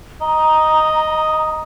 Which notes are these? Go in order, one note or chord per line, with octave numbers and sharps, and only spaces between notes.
D#5 A#5